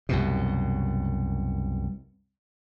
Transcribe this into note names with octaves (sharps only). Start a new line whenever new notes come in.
C2 F#2 B2